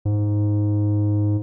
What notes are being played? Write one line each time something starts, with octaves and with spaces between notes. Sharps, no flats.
G#2